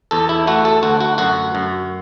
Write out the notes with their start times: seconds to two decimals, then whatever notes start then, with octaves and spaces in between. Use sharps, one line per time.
0.11 E2 A4
0.29 E4
0.47 A3 F#4
0.65 A4
0.83 D2 F#4
1.00 F#4
1.18 F#2 F#4
1.55 F#2